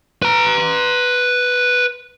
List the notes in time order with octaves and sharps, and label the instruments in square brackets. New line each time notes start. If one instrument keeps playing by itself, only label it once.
[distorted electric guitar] B4 A#5